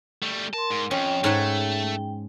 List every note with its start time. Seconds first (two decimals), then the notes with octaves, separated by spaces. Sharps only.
0.22 G3 A3
0.54 A#4 A5 C6
0.70 G#2
0.91 F2 C#4 G5
1.24 G#2 A3 C#5 F#5